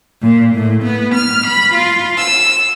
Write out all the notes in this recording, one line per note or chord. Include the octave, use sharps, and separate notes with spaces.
A#2
A2
B3
F6
B5
F4
E6